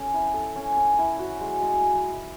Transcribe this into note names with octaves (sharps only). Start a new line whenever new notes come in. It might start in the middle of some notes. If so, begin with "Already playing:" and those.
Already playing: C#4 A4
E4
A4
C#4
C#4
E4
F#4
G#3
G#3